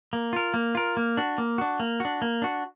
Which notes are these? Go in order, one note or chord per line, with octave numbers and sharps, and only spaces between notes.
A#3
F4 A#4
A#3
F4 A#4
A#3
D4 F#4
A#3
D4 F#4
A#3
D4 F#4
A#3
D4 F#4